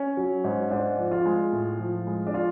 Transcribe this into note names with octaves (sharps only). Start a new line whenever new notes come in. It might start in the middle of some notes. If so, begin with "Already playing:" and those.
Already playing: C#4
F#3
G#2
G#2 D4
F3
F4
G#3
A2
F3
G#3
D4
F4